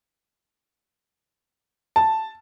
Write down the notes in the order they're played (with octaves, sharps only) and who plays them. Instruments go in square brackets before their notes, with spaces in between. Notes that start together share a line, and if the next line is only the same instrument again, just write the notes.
[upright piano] A5